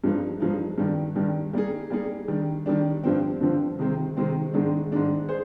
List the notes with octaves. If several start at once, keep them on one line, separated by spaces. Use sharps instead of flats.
G2 F3 G#3 D#4
G2 F3 G#3 D#4
G2 D#3 G3
G2 D#3 G3
G3 A#3 D#4 G#4
G3 A#3 D#4 G#4
D#3 G3 D4
D#3 G3 D4
G2 D3 F3 C4
G2 D3 F3 C4
C3 D#3 G#3 C4
C3 D#3 G#3 C4
G#2 D#3 G#3 D4
G#2 D#3 G#3 D4
G#4 C5